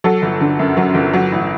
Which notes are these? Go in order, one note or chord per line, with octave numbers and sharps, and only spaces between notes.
F#3 A4
G1
D3
F#2
F#3
G1
F#3
A1